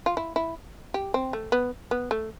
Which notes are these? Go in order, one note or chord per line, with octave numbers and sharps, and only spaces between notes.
F4
E4
E4
G4
C4
A3
B3
B3
A3